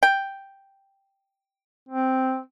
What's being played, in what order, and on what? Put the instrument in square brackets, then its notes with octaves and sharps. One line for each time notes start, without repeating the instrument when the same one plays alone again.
[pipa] G5
[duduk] C4